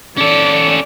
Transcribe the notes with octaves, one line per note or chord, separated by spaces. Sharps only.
C#4 A4 D5